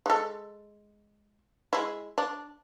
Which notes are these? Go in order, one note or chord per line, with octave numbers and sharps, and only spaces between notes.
G#3 A4
G#3 E4
D4